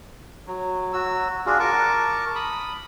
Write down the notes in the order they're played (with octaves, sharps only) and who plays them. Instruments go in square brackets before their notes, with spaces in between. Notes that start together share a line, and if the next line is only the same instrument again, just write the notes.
[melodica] F#3
F#3 F#4 E6
D4 F4 F#4 G#4
A#4 A5 C#6 D6
B5 D#6